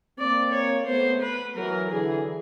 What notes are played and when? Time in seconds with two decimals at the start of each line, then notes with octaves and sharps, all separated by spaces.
0.18 A#3 C4 D5
0.52 C#5
0.87 A3 B3 C5
1.22 B4
1.56 E3 F#3 A#4
1.90 D3 E3 G#4